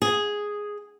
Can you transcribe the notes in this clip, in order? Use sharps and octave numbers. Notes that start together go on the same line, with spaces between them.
G#4